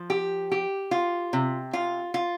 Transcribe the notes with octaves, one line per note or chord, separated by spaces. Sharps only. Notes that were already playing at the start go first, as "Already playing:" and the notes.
Already playing: F3
G4
G4
F4
C3
F4
F4